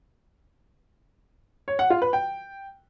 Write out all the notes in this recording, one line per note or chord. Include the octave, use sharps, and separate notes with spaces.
C#5
F#5
F4
B4
G5